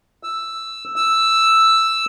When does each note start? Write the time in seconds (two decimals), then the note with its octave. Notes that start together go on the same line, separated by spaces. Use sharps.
0.23 E6
0.96 E6